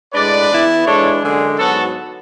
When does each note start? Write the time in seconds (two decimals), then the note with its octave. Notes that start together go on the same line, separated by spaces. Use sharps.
0.13 A2 G#3 D4 B4 D5
0.50 E3 B3 E4
0.86 E3 G#3 D4 A4 C#5
1.22 F#2 D3 G#3 G#4
1.58 G#2 F#3 B3 F#4 A4